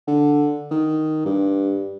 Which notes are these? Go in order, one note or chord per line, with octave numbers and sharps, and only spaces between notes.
D3
D#3
G2